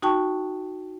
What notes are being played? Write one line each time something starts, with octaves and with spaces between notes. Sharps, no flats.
D#4 F#4 G5 A5 C#6